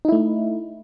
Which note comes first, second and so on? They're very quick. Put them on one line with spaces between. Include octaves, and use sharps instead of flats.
D#4 E4 A3